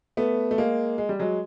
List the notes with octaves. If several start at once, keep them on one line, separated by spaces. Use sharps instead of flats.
A3 B3
A3
G#3 A#3
G#3
G3
F#3 G#3